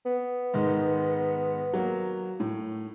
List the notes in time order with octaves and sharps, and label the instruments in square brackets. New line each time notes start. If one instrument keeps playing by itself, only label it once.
[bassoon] B3
[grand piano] G#2 D#3 G#3
F#3 A#3
A2